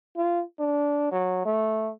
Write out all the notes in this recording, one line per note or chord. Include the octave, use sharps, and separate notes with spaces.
F4
D4
F#3
A3